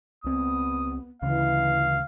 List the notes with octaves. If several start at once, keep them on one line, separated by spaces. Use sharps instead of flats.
C#2 B3 C4 D#6
D2 C#3 E3 F5